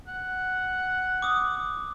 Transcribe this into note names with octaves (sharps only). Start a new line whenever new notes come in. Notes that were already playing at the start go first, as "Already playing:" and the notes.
F#5
D6 D#6